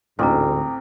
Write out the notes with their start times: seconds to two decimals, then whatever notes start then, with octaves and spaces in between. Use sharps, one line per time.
0.19 A1 D2 G#2 C4 A#5 D6 D#6